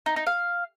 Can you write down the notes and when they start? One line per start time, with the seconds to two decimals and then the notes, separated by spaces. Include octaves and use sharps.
0.06 D#4
0.16 D#4
0.26 F5